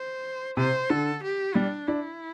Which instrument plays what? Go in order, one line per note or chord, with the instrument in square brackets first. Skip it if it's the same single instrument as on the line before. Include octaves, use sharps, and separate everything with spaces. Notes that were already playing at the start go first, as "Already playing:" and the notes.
Already playing: [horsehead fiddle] C5
[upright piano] C3 [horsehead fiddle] C5
[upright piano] D3 [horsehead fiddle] A4
[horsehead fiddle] G4
[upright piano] G3 [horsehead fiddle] D4
[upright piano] D4 [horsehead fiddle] E4